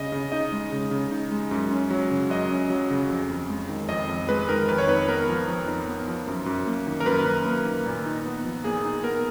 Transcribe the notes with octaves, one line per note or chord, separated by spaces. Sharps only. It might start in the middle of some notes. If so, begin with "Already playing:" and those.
Already playing: C#3 D#5
C#3
D#4 D#5
G#3
C#3
C#3
D#4
G#3
F#2
C#4
F#3
C#3
F#2 D#5
C#4
F#3
C#3
F2
F2
G#3
D#3
F2 D#5
F2
G#3 B4
D#3 A#4
F2 B4
C#5
D#4 B4
B3 A#4
F3
F2
D#4
B3
F3
F#2
F#2
A#3
D#3
A#4
F#2 B4
F#2
A#3
D#3
A#2
D#4
B3
F3
A#2 G#4
D#4
B3 A#4